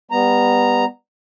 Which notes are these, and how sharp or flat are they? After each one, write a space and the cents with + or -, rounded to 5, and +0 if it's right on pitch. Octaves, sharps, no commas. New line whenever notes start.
G3 +25 B3 +0 A#5 -5